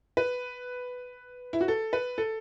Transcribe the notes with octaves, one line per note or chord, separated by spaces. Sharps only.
B4
E4
F#4
A4
B4
A4